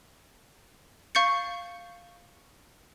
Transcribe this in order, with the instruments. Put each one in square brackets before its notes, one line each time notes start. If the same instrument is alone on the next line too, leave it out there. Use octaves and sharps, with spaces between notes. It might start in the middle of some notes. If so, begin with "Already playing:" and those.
[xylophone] F5 C#6 G6 A6 C#7